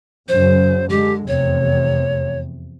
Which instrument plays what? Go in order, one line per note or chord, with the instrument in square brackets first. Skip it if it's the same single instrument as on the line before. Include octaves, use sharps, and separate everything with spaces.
[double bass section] F#2 C#3 F#3 [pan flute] C5
[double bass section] D3 G#3 [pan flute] G4
[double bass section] F1 E2 C3 [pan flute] C#5